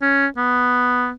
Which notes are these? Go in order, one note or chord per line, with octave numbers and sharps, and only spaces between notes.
C#4
B3